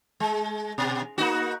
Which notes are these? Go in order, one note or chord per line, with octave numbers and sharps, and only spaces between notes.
G#3
B2
A#3 D#4 F#4